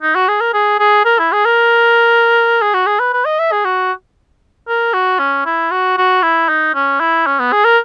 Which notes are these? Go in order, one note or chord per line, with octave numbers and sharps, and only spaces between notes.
D#4
F#4
G#4
A#4
G#4
G#4
A#4
E4
G#4
A#4
G#4
F#4
G#4
B4
B4
D#5
E5
G#4
F#4
A#4
F#4
C#4
E4
F#4
F#4
E4
D#4
C#4
E4
C#4
B3
G#4
A#4